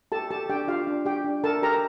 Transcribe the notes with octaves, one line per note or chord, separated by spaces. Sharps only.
G4 A4 A5
G4 A4 A5
D4 G4 G5
F4 G4 F5
D4
G4 G5
D4
A4 A#4 A5
G4 A#4 A#5